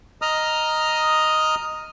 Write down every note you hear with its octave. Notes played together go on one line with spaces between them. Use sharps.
D#5 A#5 D#6 F6